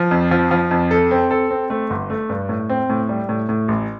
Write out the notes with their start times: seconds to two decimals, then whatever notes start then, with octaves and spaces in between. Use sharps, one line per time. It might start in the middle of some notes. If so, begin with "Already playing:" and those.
Already playing: F3
0.11 F2
0.31 F3
0.51 F3
0.71 F2
0.91 A4
1.11 C4
1.31 A4
1.51 C4
1.70 A3
1.90 G1
2.10 A3
2.29 G2
2.49 A2
2.69 C4
2.90 A2
3.09 G3
3.29 A2
3.49 A2
3.68 A1